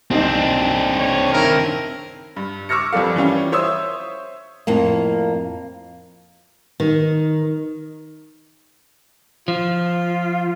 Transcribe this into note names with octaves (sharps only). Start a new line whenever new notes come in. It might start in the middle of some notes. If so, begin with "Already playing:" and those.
C2 C4 D4 D#4 D#5
C#5
D#3 E4 A#4
G2
C#6 D6 E6 F6 A#6 C#7
G1 F2 F3 G3 A4 F5
E3 G3 C#4 F4
C5 C#5 E5 C6 D#6 E6
F2 A2 A#3
D#3
F3 F4